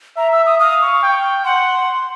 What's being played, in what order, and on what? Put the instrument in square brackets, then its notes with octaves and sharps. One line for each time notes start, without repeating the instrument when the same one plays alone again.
[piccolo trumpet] E5 [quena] A#5
[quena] E6
D#6
[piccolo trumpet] F5 [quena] D#6
[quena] C#6
[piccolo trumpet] G5
[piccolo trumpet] F#5 [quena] C6